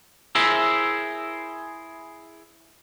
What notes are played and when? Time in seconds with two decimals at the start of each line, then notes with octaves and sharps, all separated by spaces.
0.35 E4 G#4 A#4 C5 E5